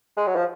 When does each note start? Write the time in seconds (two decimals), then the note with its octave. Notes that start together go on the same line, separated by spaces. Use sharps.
0.17 G#3
0.27 F#3
0.35 F3